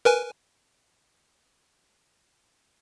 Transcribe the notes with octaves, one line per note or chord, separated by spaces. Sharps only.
A#4 B4 G#5